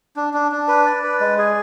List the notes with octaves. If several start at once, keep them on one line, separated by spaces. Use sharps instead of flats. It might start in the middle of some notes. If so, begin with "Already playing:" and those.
D4
D4
D4
B4
D5
B4
G#3
G#4